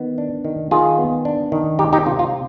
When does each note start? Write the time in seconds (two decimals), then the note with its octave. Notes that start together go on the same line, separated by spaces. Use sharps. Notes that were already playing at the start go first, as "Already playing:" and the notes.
Already playing: D#3 B3
0.18 D4
0.45 D#3
0.71 D#3 F4 G#4
0.98 B3
1.25 D4
1.52 D#3
1.79 G#3 D#4 G4
1.93 D#4 G4
2.06 C3 F4
2.19 F4